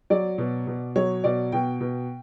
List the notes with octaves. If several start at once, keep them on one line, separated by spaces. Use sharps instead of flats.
F#3 D5
B2
B2
F#3 C#5
B2 D5
B2 G5
B2